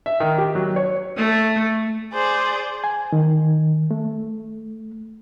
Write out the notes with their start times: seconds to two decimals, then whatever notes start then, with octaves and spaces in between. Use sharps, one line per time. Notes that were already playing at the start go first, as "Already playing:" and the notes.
0.06 E5
0.20 D#3
0.38 G4
0.55 F#3
0.76 C#5
1.16 A3
2.14 G#4 C5 D5
2.84 G#5
3.12 D#3
3.91 A3